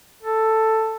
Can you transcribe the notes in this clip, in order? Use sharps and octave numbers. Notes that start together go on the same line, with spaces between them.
A4